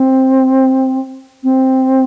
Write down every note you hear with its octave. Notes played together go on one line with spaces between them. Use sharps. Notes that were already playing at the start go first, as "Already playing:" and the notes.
Already playing: C4
C4